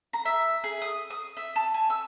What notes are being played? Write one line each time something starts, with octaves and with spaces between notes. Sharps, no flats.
A#5
E5
G#4
D#6
D#6
E5
A5
G#5
E6